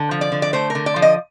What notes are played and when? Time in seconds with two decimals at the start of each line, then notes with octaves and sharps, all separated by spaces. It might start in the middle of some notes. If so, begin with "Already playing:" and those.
Already playing: D3
0.11 F3
0.21 D5
0.32 D3
0.42 D5
0.53 A3 C5
0.70 A#4
0.75 D3
0.86 D5
0.96 F3
1.02 D#5